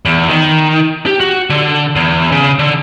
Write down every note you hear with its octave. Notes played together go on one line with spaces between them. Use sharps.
E2
D#3
G4
F#4
D3
E2
C#3
D3